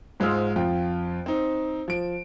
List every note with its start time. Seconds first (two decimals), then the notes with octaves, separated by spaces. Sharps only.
0.20 G#2 G#3 F4 C5 E6 F6
0.56 F2 F4 G5
1.26 C4 D#4
1.88 F3 D7